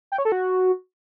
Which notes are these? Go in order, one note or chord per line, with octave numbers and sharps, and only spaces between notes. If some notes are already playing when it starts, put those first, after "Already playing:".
G5
C#5
A4
F#4